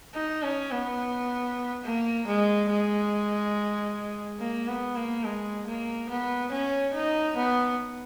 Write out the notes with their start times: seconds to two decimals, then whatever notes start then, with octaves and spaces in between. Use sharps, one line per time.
0.14 D#4
0.42 C#4
0.71 B3
1.84 A#3
2.27 G#3
2.70 G#3
4.39 A#3
4.68 B3
4.96 A#3
5.24 G#3
5.67 A#3
6.09 B3
6.51 C#4
6.94 D#4
7.36 B3